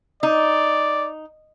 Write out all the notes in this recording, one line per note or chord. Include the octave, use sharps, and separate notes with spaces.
D#4 D5